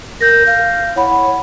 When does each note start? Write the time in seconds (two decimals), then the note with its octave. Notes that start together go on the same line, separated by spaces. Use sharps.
0.21 A#4 G6 A#6
0.47 F5
0.96 E4 C#5 F#5 B5